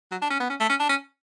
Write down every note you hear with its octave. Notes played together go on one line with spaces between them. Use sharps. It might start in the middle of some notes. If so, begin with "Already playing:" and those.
F#3
D4
C#4
B3
C#4
A3
C#4
D4
C#4